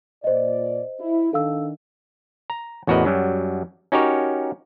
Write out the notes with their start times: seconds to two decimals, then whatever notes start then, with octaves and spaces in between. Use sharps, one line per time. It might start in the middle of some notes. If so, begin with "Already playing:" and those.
0.24 A#2 C5 D5 D#5
1.00 E4
1.33 D#3 D4 A4 F5 E6
2.50 A#5
2.87 A1 E2 F#4 A#4 B4 D#5
3.05 F#2 F#3 G3
3.92 C#4 D#4 F#4 G4 A#4 C#5